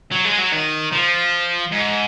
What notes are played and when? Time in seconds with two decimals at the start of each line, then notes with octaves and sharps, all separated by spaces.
0.12 F#3
0.25 G#3
0.38 F#3
0.52 D#3
0.92 F3
1.72 G#2